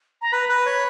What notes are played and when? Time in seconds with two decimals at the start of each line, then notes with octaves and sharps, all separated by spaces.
0.22 A#5
0.32 B4 B5
0.49 B4
0.66 C#5